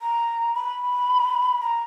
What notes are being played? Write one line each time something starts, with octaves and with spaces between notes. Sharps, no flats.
A#5
B5
A#5